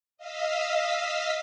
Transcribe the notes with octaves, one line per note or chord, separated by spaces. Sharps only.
D#5 F5 E6 B6